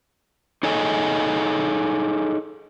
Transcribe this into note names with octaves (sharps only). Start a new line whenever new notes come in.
D#4 G#4 A4 C#5 D#5 G#5